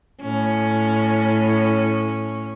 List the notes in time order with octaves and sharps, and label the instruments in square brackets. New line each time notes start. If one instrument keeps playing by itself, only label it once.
[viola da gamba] A2 C#4